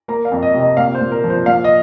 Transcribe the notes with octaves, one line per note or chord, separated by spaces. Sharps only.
A#3 A#5
F5
F2
D#5
C3
D#5
A#2 F5
C5
A#2
A#4
F3
C5
A#2 F5
D#5